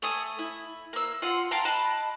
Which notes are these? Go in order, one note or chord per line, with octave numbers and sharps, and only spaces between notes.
A3 G#5 D#6
E4
A#3 E6
F4 F#5 C6
F5 G5 A5 A#5
D#5 A5 B5 F#6